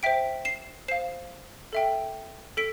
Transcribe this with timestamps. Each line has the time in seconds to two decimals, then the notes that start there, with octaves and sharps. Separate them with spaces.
0.03 C5 E5 G5 B6 D7
0.45 C7 E7
0.88 C5 F5 C7 E7
1.73 A4 E5 G5
2.57 A4 B6 D7